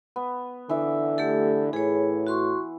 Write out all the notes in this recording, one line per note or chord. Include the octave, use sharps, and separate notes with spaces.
B3
D3 E3 E5 D6
A3 G4 A4
A2 E3 G#4 C#5
F#4 C6 C#6